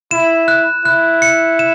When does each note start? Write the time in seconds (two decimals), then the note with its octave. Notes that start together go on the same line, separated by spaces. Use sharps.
0.11 E4 E7
0.48 F#6
0.85 E4 F#6
1.22 C#7
1.59 E7